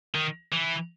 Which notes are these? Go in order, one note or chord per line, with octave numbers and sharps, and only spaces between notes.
D#3
E3